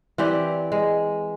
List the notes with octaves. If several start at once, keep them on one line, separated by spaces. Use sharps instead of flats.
E3 C4 G4 D5
G#3